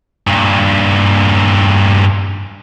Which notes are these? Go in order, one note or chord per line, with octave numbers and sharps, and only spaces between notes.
G2 A#2